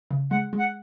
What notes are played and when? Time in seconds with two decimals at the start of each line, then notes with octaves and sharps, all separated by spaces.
0.11 C#3
0.31 G#3 F#5
0.53 G#3
0.59 F#5